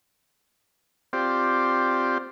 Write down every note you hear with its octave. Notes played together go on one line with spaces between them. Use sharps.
C4 F4 G4 C5 D5